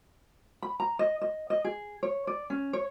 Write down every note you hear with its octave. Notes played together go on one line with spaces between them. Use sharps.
B5
A#5
D#5
D#5
D#5
G#4
C#5
D5
C#4
C#5